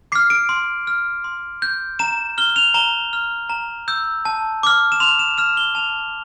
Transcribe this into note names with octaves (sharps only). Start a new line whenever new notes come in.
D6 F6 C7
D7
C6
F6
C6
G6
A#5 E7
F6 G7
F7
A#5 G7
F6
A#5
E6 G6
A5
D6 F6
E7
C6 F7
E7
F6 E7
G7
A5 F7